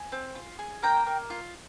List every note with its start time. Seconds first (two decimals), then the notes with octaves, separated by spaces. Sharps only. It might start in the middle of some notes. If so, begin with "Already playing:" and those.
Already playing: G#5
0.12 C4
0.35 F4
0.59 G#4
0.83 A#3 G5 A#5
1.07 A#3
1.30 F4